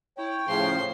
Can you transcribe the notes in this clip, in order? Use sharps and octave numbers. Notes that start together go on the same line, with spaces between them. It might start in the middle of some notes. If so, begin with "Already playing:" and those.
E4 C#5 G5
A2 C#3 F3 C5 C6